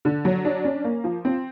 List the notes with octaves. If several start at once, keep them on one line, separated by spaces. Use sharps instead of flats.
D3
F#3
D4
C#4
A#3
F3
C4